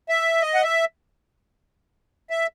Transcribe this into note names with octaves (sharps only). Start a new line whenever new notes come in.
E5
D#5
F#5
E5
E5